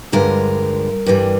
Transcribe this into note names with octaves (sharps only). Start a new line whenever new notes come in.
G2 D3 F3 G#3 A#4
G2 E3 G3